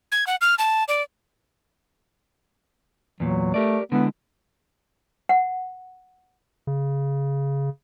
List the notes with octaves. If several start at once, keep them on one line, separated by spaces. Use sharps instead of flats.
G#6
F#5
F6
A5
D5
E2 A#2 F#3
A3 G4 A#4 D5
D3 G#3 B3 E4
F#5
C#3